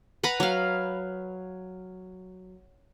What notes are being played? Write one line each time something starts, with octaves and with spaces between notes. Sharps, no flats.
B4 F#5 A#5 B5
F#3 F5